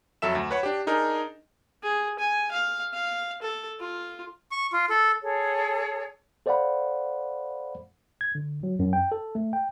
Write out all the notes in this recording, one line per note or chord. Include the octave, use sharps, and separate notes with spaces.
F2 F#3 A4 E5 E7
D2
B4 C#5 F#5
D4 G4
D4 D#4 G#4 A#4
G#4
G#5
F5
F5
A4
F4
C#6
F4
A4
G#4 A4 C#5
A4 C5 D5 F5 F#5 B5
G#6
D3
F#3
F#2
G5
A4
A3
G5